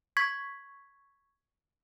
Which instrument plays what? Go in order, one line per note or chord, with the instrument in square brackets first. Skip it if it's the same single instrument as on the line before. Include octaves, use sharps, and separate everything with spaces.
[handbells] C#6 G#6 B6